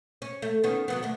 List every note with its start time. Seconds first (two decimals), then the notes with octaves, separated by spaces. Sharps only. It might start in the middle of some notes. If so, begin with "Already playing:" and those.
0.22 C#4
0.42 A3
0.64 D#3 B3 C#4
0.88 D#3 F#3 B3
1.03 D3 A3